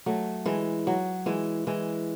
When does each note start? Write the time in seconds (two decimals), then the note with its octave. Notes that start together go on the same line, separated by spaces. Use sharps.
0.06 F#3 A3
0.46 E3 G#3
0.87 F#3
1.26 E3 G#3
1.67 E3 G#3